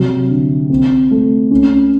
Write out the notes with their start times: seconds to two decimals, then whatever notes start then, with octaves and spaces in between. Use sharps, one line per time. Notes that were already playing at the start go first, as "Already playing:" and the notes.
Already playing: C3 F#3
0.29 D3
0.70 C4
1.11 A3
1.51 C#4